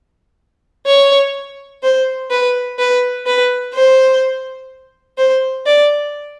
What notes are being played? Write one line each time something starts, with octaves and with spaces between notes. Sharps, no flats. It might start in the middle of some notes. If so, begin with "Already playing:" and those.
C#5
C5
B4
B4
B4
C5
C5
D5